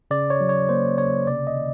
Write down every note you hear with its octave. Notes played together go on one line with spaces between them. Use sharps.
C#3 D5
C#5
F#3
C#5
A#3 C5
C#3 C#5
C3 D5
D#5
D#3